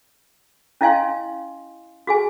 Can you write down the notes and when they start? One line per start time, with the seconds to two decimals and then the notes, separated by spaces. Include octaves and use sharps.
0.81 C#4 E4 D#5 F5 G#5 C6
2.07 F#4 G#4 G#5